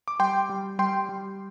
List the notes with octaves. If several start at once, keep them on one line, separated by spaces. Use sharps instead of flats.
D6
G3 G5 C6
G3
G3 G5 C6
G3